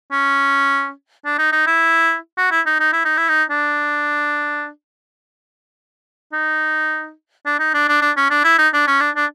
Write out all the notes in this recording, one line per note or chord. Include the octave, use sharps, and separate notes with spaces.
C#4
D4
D#4
D#4
E4
F#4
E4
D#4
D#4
E4
D#4
E4
D#4
D4
D#4
D4
D#4
D4
D4
D4
C#4
D4
E4
D#4
D4
C#4
D4
D4